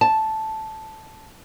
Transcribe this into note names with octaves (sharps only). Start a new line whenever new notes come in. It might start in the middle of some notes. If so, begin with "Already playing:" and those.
A5